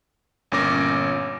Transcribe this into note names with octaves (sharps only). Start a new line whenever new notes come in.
G1 A#2 C#4 D6 A#6